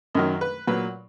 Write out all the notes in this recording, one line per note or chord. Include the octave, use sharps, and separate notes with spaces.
F#2 D#3 F#3 D#5
B4
A#2 F#3 B4